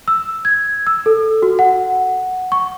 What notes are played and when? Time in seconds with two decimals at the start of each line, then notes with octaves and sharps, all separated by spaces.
0.08 E6
0.45 G#6
0.87 E6
1.06 A4
1.42 F#4
1.59 F#5
2.52 C#6